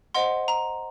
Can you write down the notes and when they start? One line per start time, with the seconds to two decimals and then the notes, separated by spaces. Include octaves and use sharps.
0.14 C5 D#5 F#5 C6
0.48 A#5